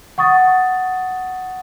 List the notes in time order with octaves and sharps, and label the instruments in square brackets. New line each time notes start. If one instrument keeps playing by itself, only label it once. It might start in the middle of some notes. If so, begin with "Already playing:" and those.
[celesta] F#5 C#6 D#6 A6